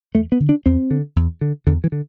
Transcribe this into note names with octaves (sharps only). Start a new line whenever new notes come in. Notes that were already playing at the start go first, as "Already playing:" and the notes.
E2 A3
B3
D3
D4
E2 C4
D3
E2
D3
E2 D3
E3
D3